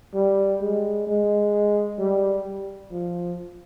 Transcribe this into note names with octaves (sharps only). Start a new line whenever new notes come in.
G3
G#3
G#3
G3
F3